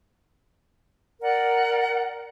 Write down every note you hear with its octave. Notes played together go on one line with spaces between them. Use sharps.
A#4 D5 F#5